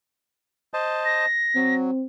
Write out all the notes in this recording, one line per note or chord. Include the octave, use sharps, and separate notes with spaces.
C5 D#5 A5
A#6
F#3 C4